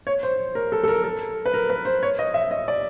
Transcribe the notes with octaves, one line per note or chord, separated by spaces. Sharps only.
C#5
C5
A#4
A4
A4
A#4
A4
B4
A#4
B4
C5
C#5
D#5
E5
D#5
D5